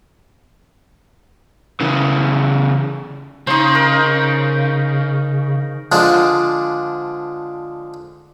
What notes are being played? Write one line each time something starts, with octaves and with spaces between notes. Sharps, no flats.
C#3 E3
C#3 D#4 C5
A#4
D3 F3 G#3 D4